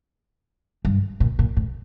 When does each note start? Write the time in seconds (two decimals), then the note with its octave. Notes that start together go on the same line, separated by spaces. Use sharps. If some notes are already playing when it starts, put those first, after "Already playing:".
0.85 G2
1.20 A#2
1.39 A#2
1.57 A2